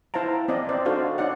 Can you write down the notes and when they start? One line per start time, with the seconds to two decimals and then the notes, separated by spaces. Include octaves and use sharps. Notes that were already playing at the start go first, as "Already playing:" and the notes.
0.14 E4 C5 F5 A5 A#5
0.48 C4 D5 D#5
0.69 C5 D5 E5
0.85 D4 D#4 F#4 A4 C5 F5
1.18 D#4 C#5 D5 F#5